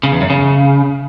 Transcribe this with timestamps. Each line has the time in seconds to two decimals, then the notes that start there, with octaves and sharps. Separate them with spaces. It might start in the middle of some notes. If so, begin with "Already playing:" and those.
0.03 C#3
0.12 E2
0.21 F#2
0.30 C#3